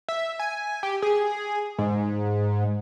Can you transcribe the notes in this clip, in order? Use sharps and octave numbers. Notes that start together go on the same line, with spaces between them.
E5
G#5
G4
G#4
G#2